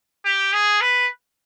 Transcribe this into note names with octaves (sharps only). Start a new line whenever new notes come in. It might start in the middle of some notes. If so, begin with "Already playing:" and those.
G4
G#4
B4